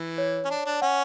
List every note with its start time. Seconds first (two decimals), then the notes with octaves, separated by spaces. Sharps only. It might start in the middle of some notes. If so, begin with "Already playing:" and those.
Already playing: E3
0.18 C#5
0.45 C#4
0.50 D4
0.66 D4
0.82 C#4 F#5